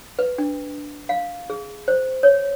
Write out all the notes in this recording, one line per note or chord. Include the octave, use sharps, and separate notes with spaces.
B4
D4
F5
G#4
C5
C#5